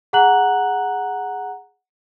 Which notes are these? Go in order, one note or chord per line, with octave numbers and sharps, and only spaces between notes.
G#4 F#5 A#5 F#6 F#7